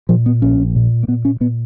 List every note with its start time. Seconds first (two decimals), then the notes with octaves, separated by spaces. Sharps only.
0.09 A#2 F3
0.26 B3
0.42 A#1 C#4
0.76 A#2
1.03 A#3
1.08 A#2 B3
1.25 C#4
1.40 A#2 B3